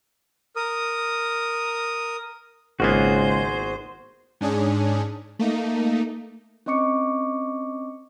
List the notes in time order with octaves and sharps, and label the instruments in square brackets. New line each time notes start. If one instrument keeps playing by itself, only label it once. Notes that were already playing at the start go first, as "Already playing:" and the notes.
[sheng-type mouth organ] A#4 D#6
[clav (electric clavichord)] G#1 A#3 B3 [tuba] C#2 [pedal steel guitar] F#4 G#4 [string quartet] C5
[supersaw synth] G#2 C#4 D4 G#4
A3 A#3 D#4
[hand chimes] C4 C#4 D#5 C#6 D6 C#7